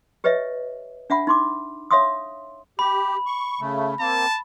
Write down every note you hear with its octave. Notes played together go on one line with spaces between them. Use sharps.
G4 B4 C#5 D#5 E5
D4 E5 F#5 B5
D#4 C6 D6
C#5 E5 F5 C6 D#6
G4 B5
C#6
C#3 A3
A#3 C4 A5